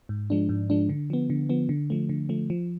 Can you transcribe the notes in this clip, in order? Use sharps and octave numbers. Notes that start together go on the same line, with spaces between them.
G#2
F3 G#3 D4
G#2
F3 G#3 D4
D3
F3 B3
D3
F3 B3
D3
F3 A3
D3
F3 A3
F3